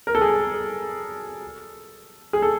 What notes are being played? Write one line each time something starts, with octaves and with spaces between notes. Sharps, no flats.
A#4
A4
G#4
A4
G#4
A4